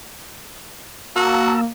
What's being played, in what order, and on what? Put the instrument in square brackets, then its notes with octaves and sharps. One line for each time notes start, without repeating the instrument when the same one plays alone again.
[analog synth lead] A#3 [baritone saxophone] F#4 [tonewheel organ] A5 A#5 E6